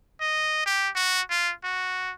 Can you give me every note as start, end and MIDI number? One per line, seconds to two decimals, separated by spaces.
0.21 0.66 75
0.66 0.89 67
0.96 1.21 66
1.30 1.52 65
1.64 2.13 66